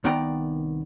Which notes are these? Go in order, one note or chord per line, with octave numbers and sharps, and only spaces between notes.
C2 D#3 B3 D5 G5 A#5